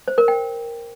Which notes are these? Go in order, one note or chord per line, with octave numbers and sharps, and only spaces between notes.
C5
A#4
G5